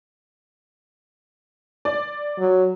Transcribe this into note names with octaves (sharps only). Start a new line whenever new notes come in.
D5
F#3